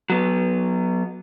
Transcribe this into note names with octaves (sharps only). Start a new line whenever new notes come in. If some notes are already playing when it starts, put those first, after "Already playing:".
F#3 B3